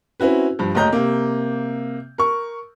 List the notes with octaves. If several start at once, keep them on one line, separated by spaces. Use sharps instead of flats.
C4 C#4 E4 F#4 B4
G2 F3
F#1 D2 C#5 D#5 A#5 G6
C3 A#3
A#4 C#6